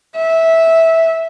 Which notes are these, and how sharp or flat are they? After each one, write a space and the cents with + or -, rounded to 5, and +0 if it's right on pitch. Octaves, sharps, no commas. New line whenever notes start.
E5 -10